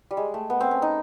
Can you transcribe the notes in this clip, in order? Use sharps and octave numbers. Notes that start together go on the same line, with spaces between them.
G3
G#3
A3
B3
C4
C#4
D#4